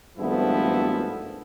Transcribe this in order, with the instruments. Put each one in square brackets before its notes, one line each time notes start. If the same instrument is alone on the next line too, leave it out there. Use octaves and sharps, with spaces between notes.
[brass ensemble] G#1 G2 F3 A3 B3 E4